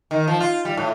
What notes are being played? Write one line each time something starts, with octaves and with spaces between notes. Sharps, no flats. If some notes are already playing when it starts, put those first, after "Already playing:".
D#3
F3
F4
G3
A2